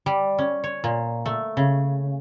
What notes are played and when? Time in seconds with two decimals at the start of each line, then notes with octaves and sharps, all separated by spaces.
0.06 G3
0.38 C#4
0.64 C#5
0.84 A#2
1.26 A3
1.57 C#3